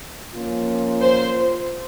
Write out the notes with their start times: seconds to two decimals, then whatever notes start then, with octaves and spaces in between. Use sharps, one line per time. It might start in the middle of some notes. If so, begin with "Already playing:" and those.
0.34 F3 A#3 C#4 F4
1.01 C5